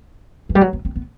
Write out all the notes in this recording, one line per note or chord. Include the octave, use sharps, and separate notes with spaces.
E3
G3
F#3
B3
C4
B3